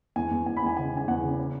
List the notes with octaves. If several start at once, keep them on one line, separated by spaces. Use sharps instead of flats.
E2 G#5
E2
E2 G#5
B5
E2 G#5
C#3 G#5
C#3 G#5
E2 F#5
C#3
C#4